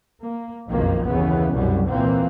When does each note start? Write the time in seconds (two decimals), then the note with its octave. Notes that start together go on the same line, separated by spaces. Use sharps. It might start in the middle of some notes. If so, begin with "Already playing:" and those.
0.22 A#3
0.70 F#1 B1 F2 D#3 F3 A#3
1.06 D#2 C#3 E3 B3
1.55 C2 F#2 B2 F#3 G3
1.87 D#2 A#2 E3 A#3 C4